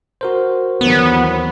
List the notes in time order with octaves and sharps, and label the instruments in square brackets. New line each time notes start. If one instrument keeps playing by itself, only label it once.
[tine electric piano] F#4 A#4 C5
[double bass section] D#2 E3 F#3 [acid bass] B3